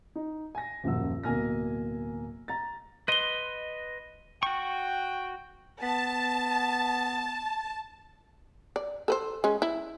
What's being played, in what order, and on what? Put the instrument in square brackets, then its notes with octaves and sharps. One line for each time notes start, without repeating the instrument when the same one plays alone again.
[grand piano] D#4
G#5 A#6
D#1 F#2 A#2 F3 F#5 E6
D1 B2 A#3 G#5 F6 A#6
A#5 A6
[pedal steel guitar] B4 D#5 C6 [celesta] D#7 G7
[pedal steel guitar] F#4 C#6 [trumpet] G5
[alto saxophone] B3 [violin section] A5
[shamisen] D5
A4 B4 C5
G#3 C#4
E4